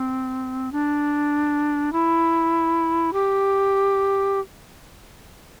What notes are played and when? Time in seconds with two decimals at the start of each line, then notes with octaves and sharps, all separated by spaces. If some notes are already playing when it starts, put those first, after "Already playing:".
Already playing: C4
0.72 D4
1.92 E4
3.13 G4